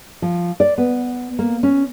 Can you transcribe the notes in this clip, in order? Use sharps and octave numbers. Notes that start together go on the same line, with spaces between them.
F3
D5
B3
A#3
C#4